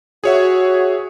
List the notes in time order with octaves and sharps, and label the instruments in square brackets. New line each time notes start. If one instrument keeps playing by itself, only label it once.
[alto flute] F#4 [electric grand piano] G#4 C#5 E5